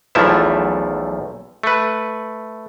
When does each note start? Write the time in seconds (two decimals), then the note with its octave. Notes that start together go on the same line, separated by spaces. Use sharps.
0.15 B1 E2 F3 A3 E4 E5
1.63 A3 B4